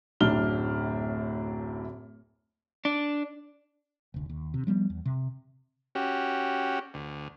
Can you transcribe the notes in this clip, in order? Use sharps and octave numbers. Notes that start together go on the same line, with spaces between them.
D1 F#2 A2 D4 F6 G7
D4
F1 D2
D#2
C3
F3 G3 B3
E2
C3
C#4 F#4 G4
D2